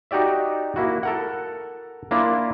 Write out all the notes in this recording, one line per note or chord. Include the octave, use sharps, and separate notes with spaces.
D#4 F#4 G4 D5 E5
A#3 E4 F#4
A4 A#4 F#5
A#3 D4 E4 F4 D5